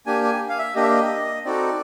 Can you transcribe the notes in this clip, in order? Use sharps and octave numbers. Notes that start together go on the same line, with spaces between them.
A#3 D4 G4 G#5
G#5
F5
E5
A#3 D4 G4 D#5
E5
D#5
C4 D#4 F#4 A4 D5